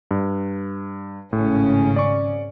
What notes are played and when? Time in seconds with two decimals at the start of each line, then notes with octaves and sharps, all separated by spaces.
0.11 G2
1.33 G#1 A2 C#3 C#4
1.96 D5 C#6